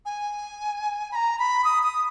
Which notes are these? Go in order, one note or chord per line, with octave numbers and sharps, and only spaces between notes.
G#5
B5
A#5
B5
D#6
D#6